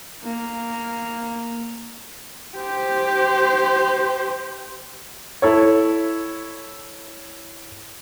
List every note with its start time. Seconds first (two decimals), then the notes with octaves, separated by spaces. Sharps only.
0.24 A#3
2.58 G4 C5
5.42 E4 A4 C#5